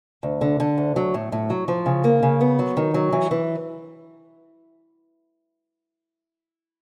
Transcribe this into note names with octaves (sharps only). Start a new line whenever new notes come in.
D2
D3
D3
D2
F#3
A2
A2
F#3
F3
C#3
A#3
C#3
B3
F#3
D#3
F#3
E3
E3